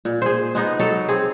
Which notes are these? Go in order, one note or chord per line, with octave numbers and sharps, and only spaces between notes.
A#2
G#4 C5
G#3 B3 D#4
F#3 A4
C4 G#4